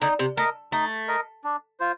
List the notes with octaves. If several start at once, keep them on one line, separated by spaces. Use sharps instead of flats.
D3 D#4
C3
A3 A#4 D#5
A3 D#4
A#4 D#5
D4
F4 C5